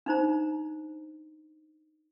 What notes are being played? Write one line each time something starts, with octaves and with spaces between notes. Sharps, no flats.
D4 D#4 C5 A#5